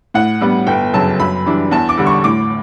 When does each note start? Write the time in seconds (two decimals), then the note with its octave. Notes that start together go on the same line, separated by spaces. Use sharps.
0.14 A2 F#5
0.41 G3 B3
0.67 G1 G5
0.94 F#2 C#3 F#3 A5
1.20 F#2 B5
1.46 E3 G3 D4
1.71 E2 A5
1.89 D6
1.98 D3 G3
2.06 C#6
2.24 A2 D6